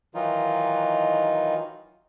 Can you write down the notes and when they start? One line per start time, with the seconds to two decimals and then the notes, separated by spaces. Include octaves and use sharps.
0.14 D#3 E3 F#3 D#4 F4